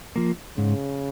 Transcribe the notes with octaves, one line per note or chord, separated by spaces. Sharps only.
F3 A#3
G#2 C#3